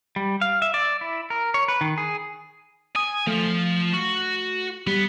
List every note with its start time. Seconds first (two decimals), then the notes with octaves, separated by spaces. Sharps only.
0.16 G3
0.41 F5
0.62 E5
0.74 D5
1.01 E4
1.30 A#4
1.54 C#5
1.68 B4
1.81 D#3
1.98 G#4
2.96 G#5 D#6
3.27 F3 A3
3.94 F#4
4.87 G3 B3